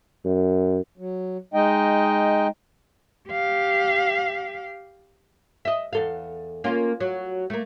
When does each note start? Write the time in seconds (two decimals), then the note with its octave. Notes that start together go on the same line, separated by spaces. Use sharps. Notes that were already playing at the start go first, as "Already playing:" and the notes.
0.25 F#2
0.98 F#3
1.54 G#3 D#4 D#5 G5
3.29 G4 F5
5.65 D#5 E5
5.93 E2 A4 F5
6.64 A#3 C#4 F4
7.00 F#3
7.50 A3 A#3